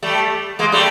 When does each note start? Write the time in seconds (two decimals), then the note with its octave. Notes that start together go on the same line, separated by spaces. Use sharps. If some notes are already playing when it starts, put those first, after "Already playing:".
0.03 G3 A3
0.59 G#3 A#3
0.72 G3 A3